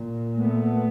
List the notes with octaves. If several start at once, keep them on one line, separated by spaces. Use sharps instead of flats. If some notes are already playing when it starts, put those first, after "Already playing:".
Already playing: A#2
A3 B3